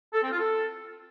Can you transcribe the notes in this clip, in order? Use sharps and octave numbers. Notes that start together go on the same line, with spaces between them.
A4
C4
F4
A4